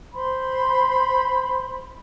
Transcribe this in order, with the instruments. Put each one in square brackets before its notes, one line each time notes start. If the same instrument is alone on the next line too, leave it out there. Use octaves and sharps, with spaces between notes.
[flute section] C5 B5 C6